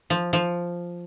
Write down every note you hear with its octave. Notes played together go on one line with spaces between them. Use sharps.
F3
F3